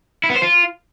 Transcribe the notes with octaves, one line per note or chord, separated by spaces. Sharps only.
E4
B3
C5
F4